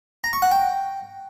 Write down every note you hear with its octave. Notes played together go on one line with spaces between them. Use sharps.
A#5
C#6
F#5
G5